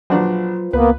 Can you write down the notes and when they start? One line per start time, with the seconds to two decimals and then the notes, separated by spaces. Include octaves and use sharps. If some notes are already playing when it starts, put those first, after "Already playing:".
0.10 A#1 F#3 D4 F4 F#4 B4 C5
0.73 C#2 A#3 B3 B4